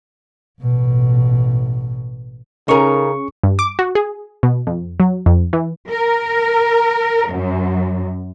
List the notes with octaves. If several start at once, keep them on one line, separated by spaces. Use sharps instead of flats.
A1 B2
C#3 C#4 D#4 G#4 A#4 C#6
G2
D6
F#4
G#4
B2
F2
F#3
F2
E3
A#4
F#2